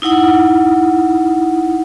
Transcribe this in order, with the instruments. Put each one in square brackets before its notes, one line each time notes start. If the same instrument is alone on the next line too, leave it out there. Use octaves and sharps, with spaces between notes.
[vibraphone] D#4 E4 F#5 D#6